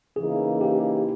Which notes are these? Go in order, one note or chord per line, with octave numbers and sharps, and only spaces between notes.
C#3 E3 A#3 D#4 G#4
G4